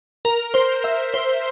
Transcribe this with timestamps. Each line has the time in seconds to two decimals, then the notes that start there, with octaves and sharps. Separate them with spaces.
0.25 A#4
0.54 C5
0.84 E5
1.14 C5